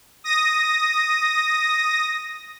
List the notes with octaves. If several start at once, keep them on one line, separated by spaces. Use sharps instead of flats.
D#6 A#6